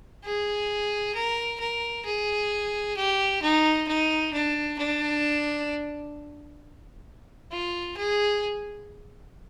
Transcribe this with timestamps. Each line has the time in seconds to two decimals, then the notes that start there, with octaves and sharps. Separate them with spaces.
0.24 G#4
1.15 A#4
1.60 A#4
2.05 G#4
2.96 G4
3.42 D#4
3.88 D#4
4.33 D4
4.79 D4
7.51 F4
7.97 G#4